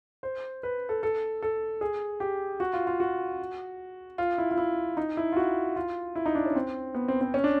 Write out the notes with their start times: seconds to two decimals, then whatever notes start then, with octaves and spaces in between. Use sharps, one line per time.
0.23 C5
0.63 B4
0.89 A4
1.03 A4
1.42 A4
1.81 G#4
2.20 G4
2.60 F#4
2.73 F4
2.87 F4
3.00 F#4
4.18 F4
4.38 E4
4.51 F4
4.58 E4
4.97 D#4
5.17 E4
5.32 F4
5.36 F#4
5.76 F4
6.15 E4
6.26 D#4
6.35 D4
6.46 C#4
6.55 C4
6.94 B3
7.08 C4
7.21 C4
7.34 C#4
7.44 D4